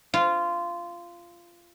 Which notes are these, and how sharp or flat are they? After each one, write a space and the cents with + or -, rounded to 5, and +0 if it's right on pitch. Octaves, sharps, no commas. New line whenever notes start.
F4 -15